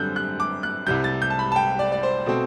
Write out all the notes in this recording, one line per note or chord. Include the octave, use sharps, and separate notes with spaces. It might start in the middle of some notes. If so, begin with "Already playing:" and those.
Already playing: F#2 D3 G3 C4 F#6 G6
F#6
D6
F#6
C2 C3 G3 G6
A6
G6
A5
B5
A5
G5
D5
D5
C5
B2 A3 C4